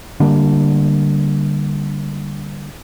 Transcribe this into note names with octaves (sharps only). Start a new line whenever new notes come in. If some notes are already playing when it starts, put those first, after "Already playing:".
D3 G3 A#3 D4